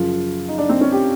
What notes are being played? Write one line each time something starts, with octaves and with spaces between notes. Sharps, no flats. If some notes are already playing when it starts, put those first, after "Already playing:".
Already playing: F#2 C#3 F3 F4
D#4
D4
C4
C#4
G4